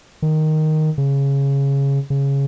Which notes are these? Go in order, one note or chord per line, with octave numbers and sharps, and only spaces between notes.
D#3
C#3
C#3